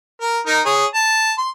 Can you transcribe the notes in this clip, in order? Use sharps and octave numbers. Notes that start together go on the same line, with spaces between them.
A#4
D#4 A#4
G#4 C#5
A5
C6